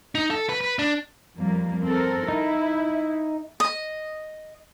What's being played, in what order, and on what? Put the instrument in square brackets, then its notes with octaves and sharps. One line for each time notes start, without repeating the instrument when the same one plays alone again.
[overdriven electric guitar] D#4
A4
B4
B4
D4
[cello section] F2 G3 A#3
C4 A4 A#4
[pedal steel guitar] D#4 [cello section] E4
[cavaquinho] D#5